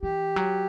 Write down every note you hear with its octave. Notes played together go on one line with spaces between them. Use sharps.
E3 G4
F#3